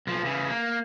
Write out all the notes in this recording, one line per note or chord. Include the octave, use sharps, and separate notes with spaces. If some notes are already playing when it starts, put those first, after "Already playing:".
B1 F3
C#3 E3
A#3